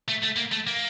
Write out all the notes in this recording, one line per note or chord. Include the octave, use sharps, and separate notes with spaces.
A3
A3
A#3
A3
A#3